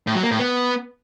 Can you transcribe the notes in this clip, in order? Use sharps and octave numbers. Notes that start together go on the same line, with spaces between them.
A2
F#3
A#3
A2
B3